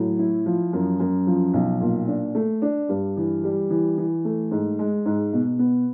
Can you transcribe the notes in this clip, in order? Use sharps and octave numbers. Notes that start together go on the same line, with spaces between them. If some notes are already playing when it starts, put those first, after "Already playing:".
Already playing: A2 F#3
E4
F3
F#2
F#2
F3
B1
A#2
D4
A3
D4
G2
E3
G3
E3
E3
A3
G#2
G#3
G#2
B2
B3